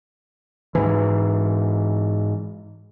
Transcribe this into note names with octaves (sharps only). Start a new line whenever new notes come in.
G#2 E3